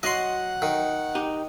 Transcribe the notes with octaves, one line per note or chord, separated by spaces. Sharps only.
F#3 F#4 D#5 F#5 C6
D#3
D#4 G4